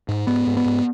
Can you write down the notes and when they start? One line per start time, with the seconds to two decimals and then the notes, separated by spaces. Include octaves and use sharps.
0.08 G#2
0.27 G#2 B3
0.47 G#2
0.57 B3
0.65 G#2